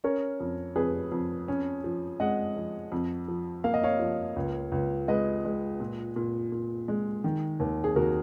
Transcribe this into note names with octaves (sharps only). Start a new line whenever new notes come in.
C#4 A#4 C#5
F2
F2 G#4 B4
F2
C#4
F3
G#3 D#5 F#5
F3
F2
F3
A#3 F5
D#5
C#5 F5
F3
C#2
C#2
G#3 B4 D#5
G#3
A#2
A#2
A#2
G#3
D#3
D#2
G#4
D#2 F#4 A#4